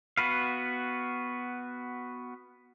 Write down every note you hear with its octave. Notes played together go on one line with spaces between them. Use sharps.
B3 F#4 B4 F5